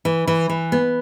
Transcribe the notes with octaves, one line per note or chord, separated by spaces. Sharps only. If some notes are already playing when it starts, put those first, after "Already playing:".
E3
E3
E3
B3